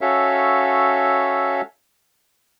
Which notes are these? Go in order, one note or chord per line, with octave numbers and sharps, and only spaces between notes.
C#4 F#4 A4 C#5 E5 F5